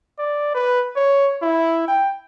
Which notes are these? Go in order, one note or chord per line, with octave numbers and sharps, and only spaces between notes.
D5
B4
C#5
E4
G5